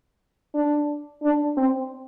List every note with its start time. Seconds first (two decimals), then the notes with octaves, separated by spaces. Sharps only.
0.54 D4
1.23 D4
1.57 C4